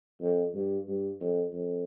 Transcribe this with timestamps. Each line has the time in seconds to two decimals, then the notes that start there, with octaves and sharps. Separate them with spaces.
0.21 F2
0.54 G2
0.88 G2
1.20 F2
1.54 F2